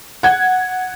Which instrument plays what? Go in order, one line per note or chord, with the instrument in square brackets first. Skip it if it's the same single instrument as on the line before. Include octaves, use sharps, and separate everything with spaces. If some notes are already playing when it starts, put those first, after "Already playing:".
[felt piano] F#5 G#6